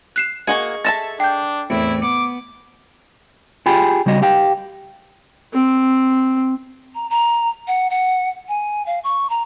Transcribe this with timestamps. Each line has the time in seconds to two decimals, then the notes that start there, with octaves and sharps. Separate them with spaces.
0.16 F#6 C7 E7
0.47 A#3 F#4 G#4 D#5 G#5 C#6
0.85 A4 E5 A5 A6 A#6 E7
1.20 D4 G5 G6
1.70 E2 A2 C4 E4
2.02 B3 D6
3.66 F4 G4 G#4 G5 B5
4.06 C#3 G3 F#4 D#5
4.22 G4 F5 G5
5.53 C4
6.95 A#5
7.10 A#5
7.68 F#5
7.90 F#5
8.48 G#5
8.86 F5
9.04 C#6
9.30 A#5